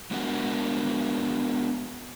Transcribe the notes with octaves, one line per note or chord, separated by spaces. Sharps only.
G#3 B3 D4 F#4 A#4 F#5